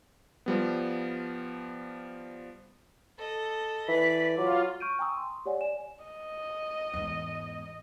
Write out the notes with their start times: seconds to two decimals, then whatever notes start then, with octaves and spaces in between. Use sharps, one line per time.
0.46 F3 G3 B3
3.18 A4 D#5
3.88 E3 B4 D5 B6
4.37 F#3 F4 D6
4.80 C#6 F6 G6 D7 D#7
4.99 G5 G#5 A#5 C#6 D#6 E6
5.17 C6
5.46 G4 C#5 D5 F#5 G#5
5.61 D5 G#5 E7
6.04 D#5
6.93 E2 G#2